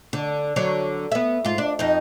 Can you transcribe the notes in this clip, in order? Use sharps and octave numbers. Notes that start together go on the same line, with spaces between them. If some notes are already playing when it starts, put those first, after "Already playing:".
D3
D3 F#3 C#5
B3 E5
G#2 F4
D4
F2 D#4